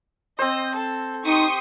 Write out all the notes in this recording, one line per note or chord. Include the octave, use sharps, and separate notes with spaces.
C4 C5 D#5
A4
D#4 G4 C6 C#6 D#6